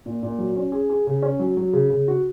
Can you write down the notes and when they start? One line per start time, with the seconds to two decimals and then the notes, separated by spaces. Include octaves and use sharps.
0.06 A#2
0.23 A#2
0.38 F#3
0.56 C#4
0.72 G#4
0.90 G#4
1.07 C#3
1.23 C#4
1.39 F#3
1.57 F#3
1.73 C#3
1.90 C#3
2.08 F#4